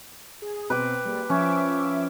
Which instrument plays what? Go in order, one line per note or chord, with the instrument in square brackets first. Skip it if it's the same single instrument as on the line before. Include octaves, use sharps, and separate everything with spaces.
[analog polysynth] G#4
[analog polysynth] B2 C4 [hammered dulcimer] B4 G5 D6
[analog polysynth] G3 G#3 A#3
[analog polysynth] F3 E5 D6 [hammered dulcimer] C#4